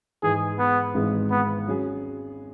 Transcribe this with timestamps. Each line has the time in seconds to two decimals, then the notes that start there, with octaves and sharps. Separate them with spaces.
0.23 G#2 E3 G#3 G#4
0.59 B3
0.94 G#1 G#2 E3 G#3
1.31 B3
1.67 F#3 C#4 G#4